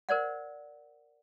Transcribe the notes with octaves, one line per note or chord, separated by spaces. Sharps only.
A#4 C5 D5 F#5